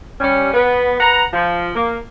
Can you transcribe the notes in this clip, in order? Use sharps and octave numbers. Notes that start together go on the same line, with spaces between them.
G3 C#4
B3 B4
B4 F#5 A#5
F3
A#3